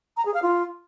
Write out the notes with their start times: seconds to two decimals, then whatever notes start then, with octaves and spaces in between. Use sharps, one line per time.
0.17 A#5
0.25 G#4
0.34 F5
0.42 F4